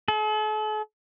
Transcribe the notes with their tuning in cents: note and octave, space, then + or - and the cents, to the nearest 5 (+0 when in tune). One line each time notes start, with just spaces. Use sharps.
A4 -45